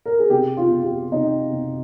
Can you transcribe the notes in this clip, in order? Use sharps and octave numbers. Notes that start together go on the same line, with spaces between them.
A#4
G#4
C3 G4
F4
C3
G4
C3 D#4
C3